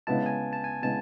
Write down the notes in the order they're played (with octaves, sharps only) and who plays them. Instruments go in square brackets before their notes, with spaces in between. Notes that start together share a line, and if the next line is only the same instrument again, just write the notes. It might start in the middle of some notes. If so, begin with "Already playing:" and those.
[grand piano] C#3 G#3 B3 E4 [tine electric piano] A5
[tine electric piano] G#5
A5
G#5
[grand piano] C#3 G#3 B3 E4 [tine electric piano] A5